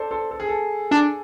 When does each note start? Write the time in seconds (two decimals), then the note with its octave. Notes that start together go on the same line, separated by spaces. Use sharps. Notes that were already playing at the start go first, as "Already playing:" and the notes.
Already playing: A4 C5 D5
0.11 A4 C5
0.31 A4
0.40 G#4
0.49 A4
0.91 D4